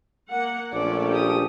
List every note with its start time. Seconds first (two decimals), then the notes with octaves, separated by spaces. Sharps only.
0.30 A#3 F#5
0.73 A#1 A3 C#4 A4 D5
1.10 G4 D#6